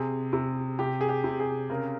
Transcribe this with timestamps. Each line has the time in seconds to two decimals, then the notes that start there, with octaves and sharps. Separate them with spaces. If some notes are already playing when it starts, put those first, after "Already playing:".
Already playing: C3 G#4
0.33 C3
0.79 C3 G4
1.01 G#4
1.09 G4
1.24 C3
1.40 G#4
1.70 C#3 A#4